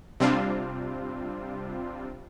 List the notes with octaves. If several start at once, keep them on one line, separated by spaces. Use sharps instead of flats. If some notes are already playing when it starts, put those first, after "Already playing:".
C3 G3 C4 D4 F4